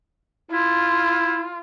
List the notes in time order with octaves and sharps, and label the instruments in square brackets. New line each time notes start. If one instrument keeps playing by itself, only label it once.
[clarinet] E4 [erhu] F4